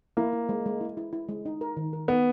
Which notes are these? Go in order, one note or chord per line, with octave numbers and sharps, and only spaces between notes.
A#3 E4
E4
G#3
G#3
E4
E4
E4
G#3
D#4
A#4
D#3
A#4
B3 D#4